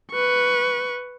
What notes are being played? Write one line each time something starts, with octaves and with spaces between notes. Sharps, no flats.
B4 C#6